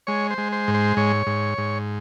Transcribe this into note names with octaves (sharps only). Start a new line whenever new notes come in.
G#3 C#5
C5
G#3
C5
G#2
C5
G#2 C#5
G#2
G#2